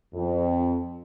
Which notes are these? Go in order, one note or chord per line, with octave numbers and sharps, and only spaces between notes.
F2